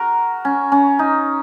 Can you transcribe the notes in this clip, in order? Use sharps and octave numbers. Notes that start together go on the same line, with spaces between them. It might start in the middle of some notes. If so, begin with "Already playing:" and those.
Already playing: F#4 A#4
C#4
C#4
D#4